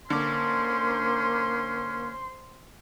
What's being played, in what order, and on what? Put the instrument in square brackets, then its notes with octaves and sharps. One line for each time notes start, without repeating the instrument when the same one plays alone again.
[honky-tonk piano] D3 D6 [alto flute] A#3 [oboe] C#4 [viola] C5 C6